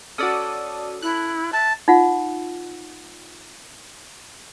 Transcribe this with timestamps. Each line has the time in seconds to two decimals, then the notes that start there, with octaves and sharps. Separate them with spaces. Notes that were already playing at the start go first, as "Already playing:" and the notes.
0.18 C#4 F#4 A4 D5 D#6 E6
1.02 E4 F#6
1.53 E5 A5 F#6
1.88 D#4 F4 F#5